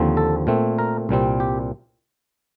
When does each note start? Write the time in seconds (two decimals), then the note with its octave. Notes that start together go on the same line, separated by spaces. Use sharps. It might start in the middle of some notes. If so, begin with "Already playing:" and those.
Already playing: D#2 D3 F3 C4
0.17 A4
0.47 A#2 A3 C4
0.79 A#4
1.09 C2 A#2 G3 C4
1.40 G4